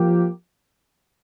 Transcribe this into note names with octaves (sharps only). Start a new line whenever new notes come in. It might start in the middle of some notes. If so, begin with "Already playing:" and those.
Already playing: F3 A#3 G4